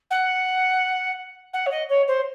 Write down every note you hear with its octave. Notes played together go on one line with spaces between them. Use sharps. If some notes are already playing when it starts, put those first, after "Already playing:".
F#5
F#5
C#5
D#5
C#5
C5